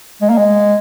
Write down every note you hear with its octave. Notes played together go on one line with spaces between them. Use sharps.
G#3
A#3
G#3